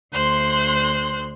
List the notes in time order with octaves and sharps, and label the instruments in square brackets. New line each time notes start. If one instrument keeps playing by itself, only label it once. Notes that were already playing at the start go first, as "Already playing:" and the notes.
[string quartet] D2 C5 C6 F#6